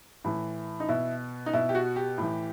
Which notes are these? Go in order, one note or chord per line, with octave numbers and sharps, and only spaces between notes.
A2 E3
D#4
B2 E4
D#4
B2 E4
G4
F#4
G4
A2 E3